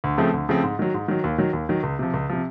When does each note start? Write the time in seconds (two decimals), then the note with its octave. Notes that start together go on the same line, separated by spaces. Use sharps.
0.04 D2
0.18 C#3 F3 A3 C4
0.34 D2
0.49 C#3 F3 A3 C4
0.63 G#2
0.79 D#3 F#3
0.94 G#2
1.08 D#3 F#3
1.24 D#2
1.38 D#3 F#3
1.53 D#2
1.69 D#3 F#3
1.83 C#2
1.99 C3 F3
2.14 C#2
2.29 C3 F3